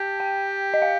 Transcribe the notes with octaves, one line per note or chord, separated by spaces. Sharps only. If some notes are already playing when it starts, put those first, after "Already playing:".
Already playing: G4 A5
G5
D#5
F5